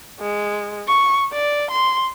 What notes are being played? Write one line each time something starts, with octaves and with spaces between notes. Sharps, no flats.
G#3
C#6
D5
C6